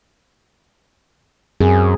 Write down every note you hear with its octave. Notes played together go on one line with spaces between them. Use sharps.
F#2 C4 G#4